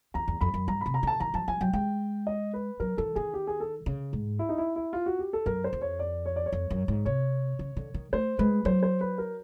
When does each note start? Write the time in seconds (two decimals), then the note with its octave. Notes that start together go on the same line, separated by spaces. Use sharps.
0.14 E2 A#5
0.28 E2
0.41 F2 B5
0.54 F#2
0.68 G2 A#5
0.81 C3 B5
0.94 A#5
1.03 D3 A5
1.20 D#3 A#5
1.34 F3 A5
1.48 F3 G#5
1.61 F#3 G5
1.73 G#3 G5
2.27 D#5
2.53 B4
2.80 F#3 A#4
2.98 E3 A4
3.15 D#3 G#4
3.34 G4
3.47 G#4
3.60 A4
3.86 C#3
4.13 G#2
4.39 E4
4.49 D#4
4.58 E4
4.76 E4
4.93 F4
5.06 F#4
5.19 G4
5.33 A4
5.46 F#2 A#4
5.64 C5
5.73 F2
5.82 C#5
5.99 D5
6.26 C#5
6.36 D5
6.46 C#5
6.53 F2
6.70 F#2
6.88 G#2
7.05 C3 C#5
7.59 C#3
7.77 D3
7.94 D#3
8.13 A3 C5
8.39 G#3 B4
8.65 F#3 C5
8.83 C5
9.01 B4
9.18 A#4